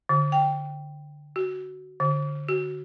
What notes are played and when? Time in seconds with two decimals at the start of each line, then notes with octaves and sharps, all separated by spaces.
0.09 D3
0.32 G5
1.36 F#4
2.00 D3
2.49 F#4